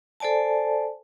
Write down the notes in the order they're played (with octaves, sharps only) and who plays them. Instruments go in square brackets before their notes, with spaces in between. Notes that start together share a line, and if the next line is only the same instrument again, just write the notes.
[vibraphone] A4 C5 D5 G#5 A5